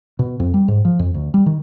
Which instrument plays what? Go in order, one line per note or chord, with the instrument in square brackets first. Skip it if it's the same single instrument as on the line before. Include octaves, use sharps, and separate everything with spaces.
[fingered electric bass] B2
F2
G3
G#2
F3
F2
D2
G3
D#3